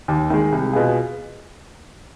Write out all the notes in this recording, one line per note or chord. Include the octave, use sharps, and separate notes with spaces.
D#2
D#3 G#3
C2
B2 B3 F4 G#4